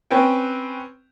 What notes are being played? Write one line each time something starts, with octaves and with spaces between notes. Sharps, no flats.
C4 C#4 B4 G5